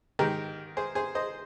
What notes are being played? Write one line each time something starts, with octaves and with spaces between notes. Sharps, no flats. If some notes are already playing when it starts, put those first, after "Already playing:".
G#2 D#3 G4 A#4
G#4 C5
G#4 C5
C5 D#5